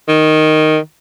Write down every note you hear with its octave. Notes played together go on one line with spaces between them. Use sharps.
D#3